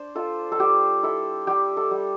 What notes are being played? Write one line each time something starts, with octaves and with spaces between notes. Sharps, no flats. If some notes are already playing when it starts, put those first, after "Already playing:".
Already playing: D4 C5 D5
F4 A4
A4
G3 G4
E4 A4
G3 G4
A4
G3